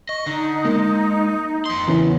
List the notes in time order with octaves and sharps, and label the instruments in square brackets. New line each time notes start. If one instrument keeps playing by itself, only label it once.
[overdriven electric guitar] D#5 [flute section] C#6
[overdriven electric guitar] D3 [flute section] D#4
[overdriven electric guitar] G#3 [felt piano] A#3
[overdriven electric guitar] F2 C6
[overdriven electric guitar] E2 C#3 [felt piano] E3 B3 C#4